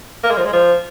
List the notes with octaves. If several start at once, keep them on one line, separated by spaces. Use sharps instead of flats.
A#3
G#3
F3
G#3
F3